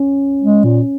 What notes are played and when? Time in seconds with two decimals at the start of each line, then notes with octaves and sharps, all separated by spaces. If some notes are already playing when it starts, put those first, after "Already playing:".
Already playing: C#4
0.42 G#3
0.64 A#2